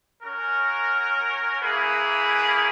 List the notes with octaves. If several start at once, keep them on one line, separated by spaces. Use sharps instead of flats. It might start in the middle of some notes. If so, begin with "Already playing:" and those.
C#4 F#4 A#4
A#3 C#4 E4 G#4 B4